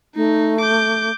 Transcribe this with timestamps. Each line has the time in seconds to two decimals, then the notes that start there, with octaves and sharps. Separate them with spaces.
0.16 A3 D#4
0.60 D6 G6